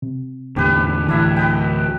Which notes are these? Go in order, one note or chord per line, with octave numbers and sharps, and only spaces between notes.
C3
E2 A2 D3 G4 B4
D2 A2 E3 D4 E4 E5
B4 D#5 G5